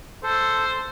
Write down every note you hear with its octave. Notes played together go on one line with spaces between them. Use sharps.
A4 C5